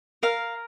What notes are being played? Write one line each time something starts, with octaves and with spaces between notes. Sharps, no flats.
A#4 F5